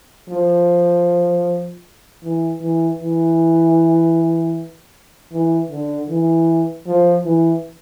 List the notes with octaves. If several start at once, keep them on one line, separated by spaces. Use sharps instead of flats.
F3
E3
E3
E3
E3
D3
E3
F3
E3